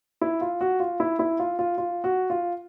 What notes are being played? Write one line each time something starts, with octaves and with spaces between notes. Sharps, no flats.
E4
F4
F#4
F4
E4
E4
F4
F4
F4
F#4
F4